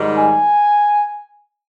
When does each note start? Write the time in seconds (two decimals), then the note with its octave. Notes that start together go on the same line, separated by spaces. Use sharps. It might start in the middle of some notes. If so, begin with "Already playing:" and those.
Already playing: G#2 D#3 G3
0.16 G#5